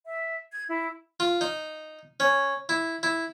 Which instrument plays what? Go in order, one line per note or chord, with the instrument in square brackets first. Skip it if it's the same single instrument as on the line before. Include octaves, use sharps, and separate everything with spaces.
[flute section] E5
G#6
E4
[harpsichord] F4
D#4
C#4
E4
E4